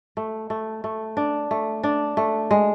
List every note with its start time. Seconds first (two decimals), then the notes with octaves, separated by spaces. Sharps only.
0.17 A3
0.50 A3
0.84 A3
1.17 D4
1.51 A3
1.83 D4
2.17 A3
2.51 G#3